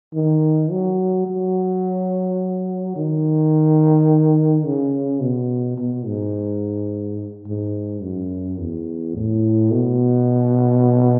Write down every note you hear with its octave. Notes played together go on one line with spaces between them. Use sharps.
D#3
F#3
F#3
D#3
C#3
B2
B2
G#2
G#2
F#2
E2
A2
B2